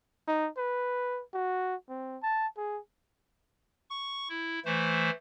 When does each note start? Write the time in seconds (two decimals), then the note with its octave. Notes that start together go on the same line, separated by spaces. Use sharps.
0.28 D#4
0.57 B4
1.34 F#4
1.89 C4
2.23 A5
2.57 G#4
3.90 C#6
4.29 E4
4.65 E3 A3 C5